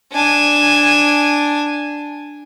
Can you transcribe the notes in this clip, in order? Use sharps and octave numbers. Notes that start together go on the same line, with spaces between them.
D4 G#5